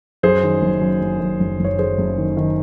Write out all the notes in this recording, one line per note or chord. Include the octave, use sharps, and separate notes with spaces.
F#2 G#4 C5
D#3
F#1
F#2
F#1
F#2
F#1
F#1 C#5
F#2 G#4 C5
F#1
D#3
D#3